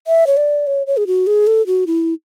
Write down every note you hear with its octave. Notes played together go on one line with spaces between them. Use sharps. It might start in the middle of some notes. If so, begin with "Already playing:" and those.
E5
C#5
D5
C#5
C#5
G#4
F#4
G#4
A4
F#4
E4